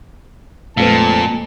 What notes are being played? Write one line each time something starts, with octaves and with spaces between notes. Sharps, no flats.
F2 A#2 G#3 A3 B4 A5